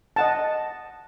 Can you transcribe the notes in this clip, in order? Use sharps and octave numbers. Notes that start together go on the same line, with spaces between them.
D#5 F#5 A5